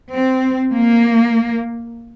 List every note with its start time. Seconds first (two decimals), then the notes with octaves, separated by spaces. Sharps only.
0.14 C4
0.72 A#3